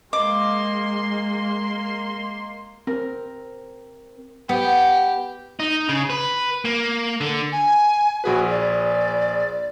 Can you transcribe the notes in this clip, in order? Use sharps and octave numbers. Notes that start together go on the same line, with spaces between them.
G#3 A#3 D#5 C6 D6
C4 A#4
B3 G4
D#4
C#3
B4
A#3
D3
G#5
A#1 F#4 G#4 B4
D5